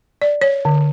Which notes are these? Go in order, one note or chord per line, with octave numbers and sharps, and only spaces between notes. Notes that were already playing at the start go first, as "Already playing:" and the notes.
D5
C#5
D3